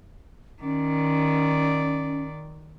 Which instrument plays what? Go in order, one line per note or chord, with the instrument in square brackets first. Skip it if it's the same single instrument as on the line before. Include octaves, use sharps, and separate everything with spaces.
[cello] D#3 D5 [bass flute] C#4